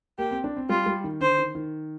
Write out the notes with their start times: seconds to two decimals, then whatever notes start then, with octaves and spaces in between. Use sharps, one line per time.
0.18 A#3 G4
0.31 C4
0.44 D4
0.57 C4
0.69 G3 F4
0.86 G3
1.04 D#3
1.21 D3 C5
1.38 D#3
1.55 D#3